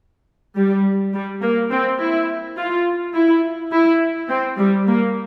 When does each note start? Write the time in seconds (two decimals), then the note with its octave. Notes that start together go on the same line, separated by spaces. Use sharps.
0.56 G3
1.14 G3
1.42 A#3
1.71 C4
2.00 E4
2.57 F4
3.15 E4
3.72 E4
4.29 C4
4.58 G3
4.87 A#3